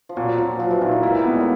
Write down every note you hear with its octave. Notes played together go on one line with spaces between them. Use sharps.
F3
A#2 F#3
A#2 F3
F3 F#3
E3
A#2 D#3
E3
G#3 A#3 E4
G3 A3 B3
G#3
F#3